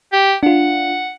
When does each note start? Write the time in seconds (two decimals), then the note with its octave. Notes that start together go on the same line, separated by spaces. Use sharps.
0.13 G4
0.43 D4 F4 F#5